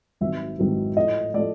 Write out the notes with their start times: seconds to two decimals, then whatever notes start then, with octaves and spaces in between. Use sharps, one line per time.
0.21 G#1 G#2 D#3 F#3 B3 E5
0.59 G#1 G#2 D#3 F#3 B3
0.97 A2 F3 A3 D#5
1.34 A2 F3 A3 D5